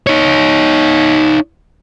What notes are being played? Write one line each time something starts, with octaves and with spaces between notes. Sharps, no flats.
D#4 C#5